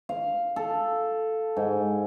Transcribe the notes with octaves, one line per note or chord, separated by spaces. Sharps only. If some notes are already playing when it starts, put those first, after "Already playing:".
F5
A4
G#2